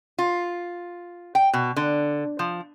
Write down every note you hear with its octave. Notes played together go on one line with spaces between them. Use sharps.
F4
G5
B2
D3
F3